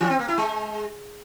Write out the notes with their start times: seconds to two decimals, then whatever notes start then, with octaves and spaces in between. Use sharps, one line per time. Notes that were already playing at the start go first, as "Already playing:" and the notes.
0.01 E3
0.10 C4
0.19 A#3
0.28 E4
0.38 G#3